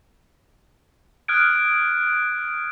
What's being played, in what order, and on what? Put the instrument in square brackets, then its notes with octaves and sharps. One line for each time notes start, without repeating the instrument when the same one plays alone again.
[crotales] D#6 F6 F#6 G#6 D7